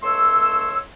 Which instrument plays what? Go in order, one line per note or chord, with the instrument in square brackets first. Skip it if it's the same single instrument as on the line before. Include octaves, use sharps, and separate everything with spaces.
[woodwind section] C#2 A3 C#5 C6 E6